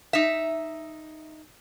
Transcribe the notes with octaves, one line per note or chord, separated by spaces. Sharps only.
D#4 E5